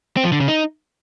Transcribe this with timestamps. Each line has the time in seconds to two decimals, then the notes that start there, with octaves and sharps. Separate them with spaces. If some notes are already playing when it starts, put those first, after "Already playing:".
0.17 C4
0.24 F3
0.32 D3
0.40 C#3
0.48 D#4